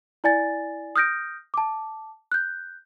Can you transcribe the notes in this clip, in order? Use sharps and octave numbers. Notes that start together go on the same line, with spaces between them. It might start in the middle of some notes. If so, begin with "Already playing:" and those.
E4 D5 G#5 A6
D#6 F6 G6 A#6 D7
A5 D6
F#6 G6